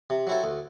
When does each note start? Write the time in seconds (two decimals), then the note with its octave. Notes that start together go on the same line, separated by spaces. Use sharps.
0.10 C3
0.27 F#3 C4 E4 A4
0.44 D2